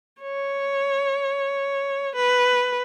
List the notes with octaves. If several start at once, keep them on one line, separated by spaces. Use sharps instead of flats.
C#5
B4